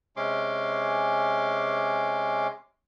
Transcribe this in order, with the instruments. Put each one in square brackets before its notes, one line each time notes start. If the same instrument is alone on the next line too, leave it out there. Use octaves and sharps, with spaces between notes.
[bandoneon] C3 G#3 C#4 C6 D6